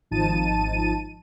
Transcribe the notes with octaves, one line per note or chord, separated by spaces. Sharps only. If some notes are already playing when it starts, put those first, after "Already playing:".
G#1 F3 D#4 A5 D#7